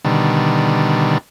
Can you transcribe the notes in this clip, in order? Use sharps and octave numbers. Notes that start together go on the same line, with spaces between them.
B2 D3 D#3 G3